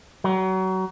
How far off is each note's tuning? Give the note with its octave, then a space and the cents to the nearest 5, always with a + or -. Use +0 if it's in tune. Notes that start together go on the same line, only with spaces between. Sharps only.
F#3 +30